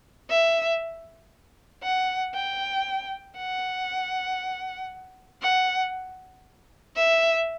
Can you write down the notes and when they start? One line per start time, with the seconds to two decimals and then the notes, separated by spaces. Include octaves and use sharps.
0.30 E5
1.83 F#5
2.35 G5
3.37 F#5
5.42 F#5
6.96 E5